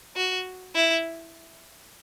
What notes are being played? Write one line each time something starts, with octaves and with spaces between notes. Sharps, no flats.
F#4
E4